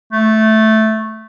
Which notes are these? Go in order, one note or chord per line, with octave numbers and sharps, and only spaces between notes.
A3